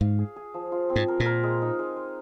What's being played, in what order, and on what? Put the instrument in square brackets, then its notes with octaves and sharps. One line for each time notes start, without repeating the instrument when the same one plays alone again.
[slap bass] G#2 [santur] F5
[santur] G#4
G#4
F3
F4
C4
[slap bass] G#2
[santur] A#4
[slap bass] A#2
[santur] A#4
G#3
D#4
G#3
G#3